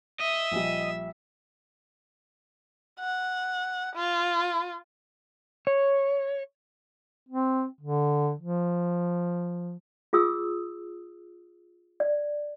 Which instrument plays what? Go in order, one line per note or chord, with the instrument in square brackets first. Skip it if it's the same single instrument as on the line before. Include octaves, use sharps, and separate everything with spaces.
[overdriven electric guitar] D#5 [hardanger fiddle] E5
[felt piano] A#1 F3 G3
[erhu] F#5
F4
[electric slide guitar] C#5
[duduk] C4
D3
F3
[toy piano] F4 G#4 D#6 E6
D5